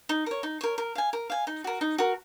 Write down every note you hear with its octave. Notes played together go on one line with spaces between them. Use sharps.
D#4
A#4 C#5
D#4
A#4 C#5
A#4
F5 G#5
A#4
F5 G#5
D#4
F#4 A#4
D#4
F#4 A#4